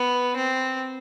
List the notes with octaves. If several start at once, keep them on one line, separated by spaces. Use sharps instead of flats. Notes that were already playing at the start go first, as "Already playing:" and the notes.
Already playing: B3
C4